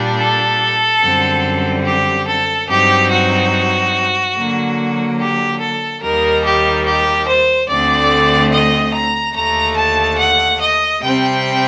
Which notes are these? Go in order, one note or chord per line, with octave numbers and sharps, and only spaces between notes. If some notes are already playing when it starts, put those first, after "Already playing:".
Already playing: A#2 G3 D4
A4
F#2 D3 G3 C4
G4
A4
G2 F#3 C4 D#4 G4
F#4
D3 F#3 A#3
G4
A4
D#2 D#3 G3 A#3 A#4
G4
G4
C5
D2 D3 A3 C4 D5
D#5
A#5
D#2 D3 A3 A#5
A5
F#5
D#5
C3 G3 C4 G5